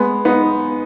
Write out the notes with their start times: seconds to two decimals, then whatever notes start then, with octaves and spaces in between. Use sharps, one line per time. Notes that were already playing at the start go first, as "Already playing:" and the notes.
Already playing: G#3 B3
0.25 B3 D#4